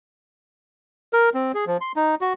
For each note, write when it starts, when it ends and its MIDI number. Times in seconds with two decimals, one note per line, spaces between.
1.13 1.29 70
1.34 1.52 60
1.55 1.65 68
1.67 1.77 53
1.81 1.92 84
1.96 2.15 63
2.21 2.33 66